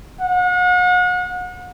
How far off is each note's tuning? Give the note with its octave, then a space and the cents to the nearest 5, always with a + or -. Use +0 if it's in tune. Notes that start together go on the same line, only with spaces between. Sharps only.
F#5 -40